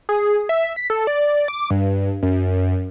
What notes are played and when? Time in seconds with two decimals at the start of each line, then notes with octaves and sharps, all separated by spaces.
0.09 G#4
0.49 E5
0.76 B6
0.90 A4
1.07 D5
1.48 D6
1.70 G2
2.23 F#2